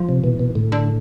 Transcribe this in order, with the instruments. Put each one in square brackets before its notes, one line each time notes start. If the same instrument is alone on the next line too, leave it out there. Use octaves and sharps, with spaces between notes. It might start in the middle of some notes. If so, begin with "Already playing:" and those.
Already playing: [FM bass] F3
[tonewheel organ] C3
[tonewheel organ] B2 [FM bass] E3
[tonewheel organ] B2
[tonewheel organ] A2 [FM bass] D3
[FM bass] D3